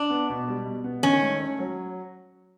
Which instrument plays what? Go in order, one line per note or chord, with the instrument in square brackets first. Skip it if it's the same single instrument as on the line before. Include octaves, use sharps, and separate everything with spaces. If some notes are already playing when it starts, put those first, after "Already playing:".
Already playing: [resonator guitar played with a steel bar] D4
[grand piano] B3
B2
G3
B2
B3
[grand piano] D#3 [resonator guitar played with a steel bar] C#4
[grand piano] A3
C#4
F#3